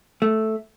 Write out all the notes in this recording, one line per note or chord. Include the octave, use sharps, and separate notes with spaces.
A3